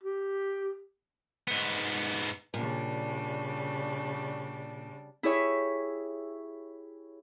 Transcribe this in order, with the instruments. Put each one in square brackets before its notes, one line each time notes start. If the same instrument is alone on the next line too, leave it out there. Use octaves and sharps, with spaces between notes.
[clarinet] G4
[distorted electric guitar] G#2 B3
[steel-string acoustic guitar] A#2 [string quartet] C#3 G3 D4
[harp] E4 G4 G#4 C#5 E5